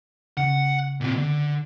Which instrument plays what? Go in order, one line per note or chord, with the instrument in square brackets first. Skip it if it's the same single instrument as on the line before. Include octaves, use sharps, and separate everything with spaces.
[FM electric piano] C#3 [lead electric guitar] F#5
[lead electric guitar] A#2 C4
D3